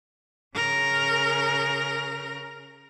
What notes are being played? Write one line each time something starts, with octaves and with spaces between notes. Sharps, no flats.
C#3 A#4